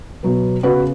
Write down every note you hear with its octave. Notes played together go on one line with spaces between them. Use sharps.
B2 F#3 B3
C#3 B3 F#4 B4